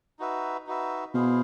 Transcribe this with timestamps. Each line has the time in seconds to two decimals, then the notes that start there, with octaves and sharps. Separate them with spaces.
0.19 D#4 F#4 B4 E5
0.67 D#4 F#4 B4 E5
1.14 B2 E4 G#4 C5 F5